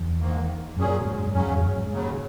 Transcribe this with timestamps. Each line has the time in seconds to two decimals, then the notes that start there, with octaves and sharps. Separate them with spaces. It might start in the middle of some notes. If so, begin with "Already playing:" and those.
Already playing: E2
0.20 G#2 D#3 A#3
0.76 F#2 A#2 F#3 C#4 G#4
1.01 A#2
1.05 G#2
1.27 G#2
1.33 F#2 C#3 F#3 C#4
1.47 E2
1.62 F#2
1.76 G#2
1.90 D#2 C#3 F#3